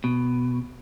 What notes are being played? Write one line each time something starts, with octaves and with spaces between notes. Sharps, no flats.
B2